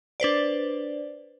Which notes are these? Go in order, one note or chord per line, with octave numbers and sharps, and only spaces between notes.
D4 B4 C5 D5